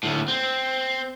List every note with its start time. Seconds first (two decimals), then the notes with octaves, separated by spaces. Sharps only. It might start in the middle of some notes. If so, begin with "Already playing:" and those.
0.03 D2 A2
0.28 C4